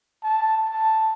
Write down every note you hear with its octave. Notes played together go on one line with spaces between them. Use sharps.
A5
A5